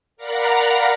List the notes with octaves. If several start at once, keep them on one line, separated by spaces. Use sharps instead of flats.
A#4 D5 F5 F#5 A#5 B5